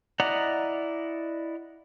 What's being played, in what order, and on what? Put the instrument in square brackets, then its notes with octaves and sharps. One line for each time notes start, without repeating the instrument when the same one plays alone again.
[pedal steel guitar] E4 D5 D#5 F#5 A#5